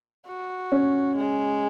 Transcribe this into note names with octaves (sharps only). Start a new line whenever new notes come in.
F#4
C#4
G#3